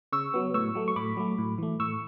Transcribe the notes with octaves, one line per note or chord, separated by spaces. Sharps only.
C#3 C#6 E6
F#3 B3
A2 C#6 E6
F#3 A3
C#6
A2 B5 D6
F#3 A3
A2
E3 A3
A2 C#6 E6